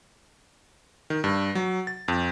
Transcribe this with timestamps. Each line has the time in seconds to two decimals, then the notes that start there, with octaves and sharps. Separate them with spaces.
1.10 D#3
1.24 G2
1.55 F#3
1.87 A6
2.08 F2